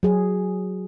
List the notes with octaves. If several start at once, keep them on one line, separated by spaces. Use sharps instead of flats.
F#3 G#4